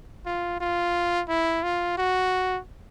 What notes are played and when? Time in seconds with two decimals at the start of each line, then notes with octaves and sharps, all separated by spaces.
0.26 F4
0.60 F4
1.29 E4
1.63 F4
1.98 F#4